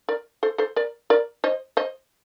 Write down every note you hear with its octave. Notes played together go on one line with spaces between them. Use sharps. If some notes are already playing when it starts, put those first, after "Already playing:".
A#4 D5
A4 C5
A4 C5
A#4 D5
A#4 D5
C5 D#5
C5 D#5